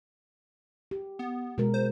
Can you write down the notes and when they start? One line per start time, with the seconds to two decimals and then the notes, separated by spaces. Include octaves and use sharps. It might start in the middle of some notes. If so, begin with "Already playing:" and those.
0.91 G4
1.19 B3
1.58 B2 G#3 A#4
1.74 C5